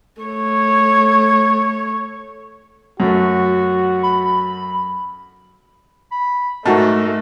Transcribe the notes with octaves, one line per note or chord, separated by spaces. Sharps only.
A3 C#5
F#2 A3 F#4
B5
B5
G#2 A3 F#4 A#4 A5